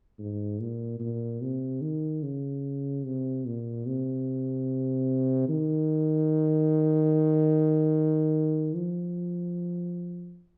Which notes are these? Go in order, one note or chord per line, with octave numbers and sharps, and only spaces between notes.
G#2
A#2
A#2
C3
D#3
C#3
C3
A#2
C3
D#3
F3